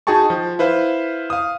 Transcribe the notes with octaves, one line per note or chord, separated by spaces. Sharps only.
D#4 F#4 G#4 G5 A5 C#6
F3
E4 B4 C5 F5
F5 D#6